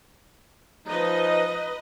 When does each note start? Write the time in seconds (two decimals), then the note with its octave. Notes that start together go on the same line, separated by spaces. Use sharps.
0.87 F3 D#4 B4 D#5